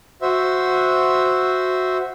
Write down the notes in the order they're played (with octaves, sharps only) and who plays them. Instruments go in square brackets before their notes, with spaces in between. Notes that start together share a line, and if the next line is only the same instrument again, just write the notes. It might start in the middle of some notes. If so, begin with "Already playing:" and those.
[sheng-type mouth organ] F#4 C5 E5